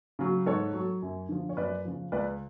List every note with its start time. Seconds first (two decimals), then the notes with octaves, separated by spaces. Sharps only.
0.19 C#3 F#3
0.46 G#2 A4 C#5
0.74 F#3
1.02 F#2
1.29 D3 F3
1.49 C#5
1.57 F#2 B4 D5
1.85 C#3 F3
2.12 C#2 B4 D5